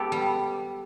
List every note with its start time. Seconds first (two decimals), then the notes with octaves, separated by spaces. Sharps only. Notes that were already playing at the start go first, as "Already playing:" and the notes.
Already playing: B3 G4 A4
0.12 G3